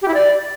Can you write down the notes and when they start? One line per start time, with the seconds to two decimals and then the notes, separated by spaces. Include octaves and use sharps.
0.02 G4
0.08 E4
0.14 D5